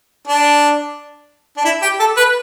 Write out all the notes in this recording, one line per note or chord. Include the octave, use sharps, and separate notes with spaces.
D4
D4
E4
G4
A4
B4